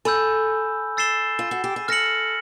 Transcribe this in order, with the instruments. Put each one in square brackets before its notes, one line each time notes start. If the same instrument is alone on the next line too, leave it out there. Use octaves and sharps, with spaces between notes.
[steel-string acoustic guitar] A4 [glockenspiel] G#5 B5 E6 G6
[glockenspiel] E6 A6 C7 E7 G7
[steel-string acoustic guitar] F4
F#4
G4
G#4
[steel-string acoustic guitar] A4 [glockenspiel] F6 A#6 C#7 F#7